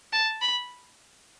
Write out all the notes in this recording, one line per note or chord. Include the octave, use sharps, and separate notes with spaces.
A5
B5